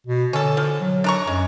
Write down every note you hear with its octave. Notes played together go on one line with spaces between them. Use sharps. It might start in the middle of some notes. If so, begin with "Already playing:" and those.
B2
D3 C#4 A4
F3
F#3
D4 A#5 C#6
F#2 G#3